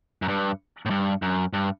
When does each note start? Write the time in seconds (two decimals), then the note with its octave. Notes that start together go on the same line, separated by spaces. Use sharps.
0.22 F#2
0.28 G2
0.86 A2
0.90 G2
1.22 F#2
1.53 G2